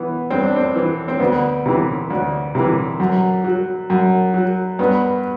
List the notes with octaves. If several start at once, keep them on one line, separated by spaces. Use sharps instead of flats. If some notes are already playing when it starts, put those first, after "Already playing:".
Already playing: E3 B3
G2 C4
D4
C4
E3
C4
D2 B3
C3 E3
D2
C3 E3
F#2
F#3
F#2
F#3
G2 B3